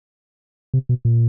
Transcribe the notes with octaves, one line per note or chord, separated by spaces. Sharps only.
C3
B2
A#2